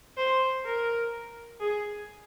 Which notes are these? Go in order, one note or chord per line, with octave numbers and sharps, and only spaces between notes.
C5
A#4
G#4